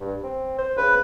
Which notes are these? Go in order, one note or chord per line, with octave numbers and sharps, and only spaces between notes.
G2
C4
C5
C#3 B4